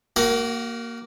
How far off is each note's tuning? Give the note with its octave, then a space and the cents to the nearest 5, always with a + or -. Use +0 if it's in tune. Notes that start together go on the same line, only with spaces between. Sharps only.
A#3 +0 F#4 +40 F#5 +0